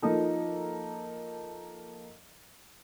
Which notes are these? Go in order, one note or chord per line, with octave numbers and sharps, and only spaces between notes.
F3 A#3 D#4 A4